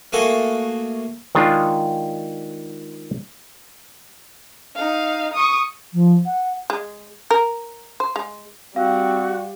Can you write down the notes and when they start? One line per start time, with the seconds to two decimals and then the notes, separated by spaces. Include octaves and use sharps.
0.12 A3 A#3 F#4 G#4 A4
1.35 D#3 G#3 D4 F4
4.75 D#4 F5
5.33 C#6 D#6
5.93 F3
6.25 F#5
6.70 G#3
7.31 A#4
8.00 C5
8.16 G#3
8.76 G3 C4 F#4 F5